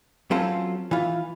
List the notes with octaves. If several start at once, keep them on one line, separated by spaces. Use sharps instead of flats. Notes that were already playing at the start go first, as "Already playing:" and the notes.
F#3 C4 C#4 F4 A4 C5
E3 F4